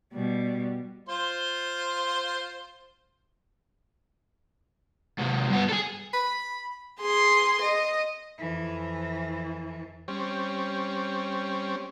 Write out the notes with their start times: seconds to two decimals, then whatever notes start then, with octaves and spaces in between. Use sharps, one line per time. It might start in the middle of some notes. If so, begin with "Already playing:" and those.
0.14 B2 G3
1.09 F4 C5 C6
5.19 G#2 C3
5.50 G2 B3
5.69 G#4 A4
6.14 B5
7.00 G#4 C6
7.61 D#5
8.38 F2 E3
10.08 G3 C4 C#4